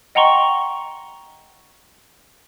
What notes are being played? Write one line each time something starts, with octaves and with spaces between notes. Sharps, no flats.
D#5 F#5 G5 A#5 C6 C#6